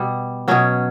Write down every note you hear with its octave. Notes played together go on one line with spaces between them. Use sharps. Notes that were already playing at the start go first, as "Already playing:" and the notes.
Already playing: B2 G3
B2 F#3 C#4